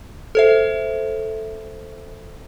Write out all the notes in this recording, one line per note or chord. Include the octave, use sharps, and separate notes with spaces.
A4 C5 E5